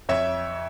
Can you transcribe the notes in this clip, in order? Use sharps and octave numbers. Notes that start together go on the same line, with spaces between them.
F2 C#5 E5